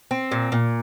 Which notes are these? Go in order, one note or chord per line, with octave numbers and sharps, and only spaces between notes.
C4
A#2
A#2